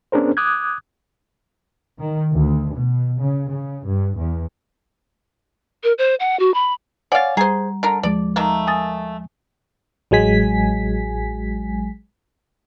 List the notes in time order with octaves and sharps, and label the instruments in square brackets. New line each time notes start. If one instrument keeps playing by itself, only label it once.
[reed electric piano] B3 C#4 D4 G#4 A#4 C5
D6 D#6 F#6 G#6
[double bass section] D#3
D2
B2
C#3
C#3
G2
E2
[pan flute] A#4
C5
F#5
F#4
B5
[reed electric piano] C#5 G#5 [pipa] D5 F5 [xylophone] F#5 A6
[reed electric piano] G3 [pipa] G#4 C5 [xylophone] A#5
[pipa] D3 A#4
[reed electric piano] D#2 F3 G#3 [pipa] D5
[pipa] D#3 A3 A#3
[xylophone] G#5 D#6 A6
[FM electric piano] A1 F#3 G#3 G#5 B6